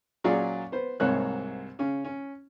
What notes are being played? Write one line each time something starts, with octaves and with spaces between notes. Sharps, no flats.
A#2 F#3 C#4 F4 G#4 D5
B3 C5
C2 G#2 C3 A#3 C#5 F#6
C#3 C#4
C#4